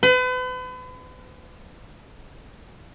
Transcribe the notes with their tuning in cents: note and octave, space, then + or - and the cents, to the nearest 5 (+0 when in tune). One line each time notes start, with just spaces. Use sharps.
B4 +40